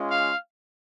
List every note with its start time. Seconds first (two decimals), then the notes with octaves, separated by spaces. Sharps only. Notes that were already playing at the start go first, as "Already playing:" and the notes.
Already playing: G#3 C#4 F4
0.10 F5